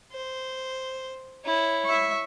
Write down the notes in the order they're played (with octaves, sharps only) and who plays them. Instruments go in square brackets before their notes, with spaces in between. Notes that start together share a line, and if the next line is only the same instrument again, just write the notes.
[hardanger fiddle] C5
E4 C#5
[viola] E5 C#6